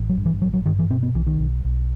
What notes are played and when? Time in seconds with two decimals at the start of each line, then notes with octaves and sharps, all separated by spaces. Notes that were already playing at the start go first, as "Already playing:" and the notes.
Already playing: A1
0.09 F#3
0.17 G2
0.25 E3
0.42 A1 F#3
0.53 F#3
0.66 G2 D#3
0.79 E3
0.90 B2 C4
1.03 B3
1.15 B1 E3
1.27 D#3
1.39 B1
1.65 B1